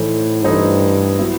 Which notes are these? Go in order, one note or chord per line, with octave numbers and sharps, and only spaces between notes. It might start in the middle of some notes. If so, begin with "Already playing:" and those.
Already playing: A2 E3 A3 D#4 A4 C5
G2 E3 A3 D#4 A4 C5
F#3 B3 E4